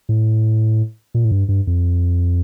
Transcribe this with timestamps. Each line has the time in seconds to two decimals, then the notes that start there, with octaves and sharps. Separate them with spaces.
0.09 A2
1.14 A#2
1.25 A2
1.31 G2
1.49 G2
1.67 F2